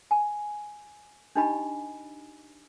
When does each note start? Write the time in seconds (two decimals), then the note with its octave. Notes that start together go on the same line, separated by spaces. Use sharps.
0.11 G#5
1.36 D4 D#4 G4 D#5 G#5 B5